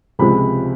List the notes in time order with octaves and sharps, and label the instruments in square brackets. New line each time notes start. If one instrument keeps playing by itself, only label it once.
[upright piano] C#2 C3 F3 G#3 B5